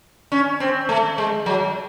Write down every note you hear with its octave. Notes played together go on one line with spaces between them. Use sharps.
C#4
C4
A3
G#3
F#3